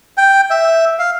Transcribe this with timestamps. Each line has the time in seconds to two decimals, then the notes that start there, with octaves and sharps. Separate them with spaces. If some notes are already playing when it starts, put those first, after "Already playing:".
0.17 G5
0.50 E5
0.99 F5